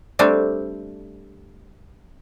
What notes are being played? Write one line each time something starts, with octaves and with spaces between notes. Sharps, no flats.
G3 A3 C4 D4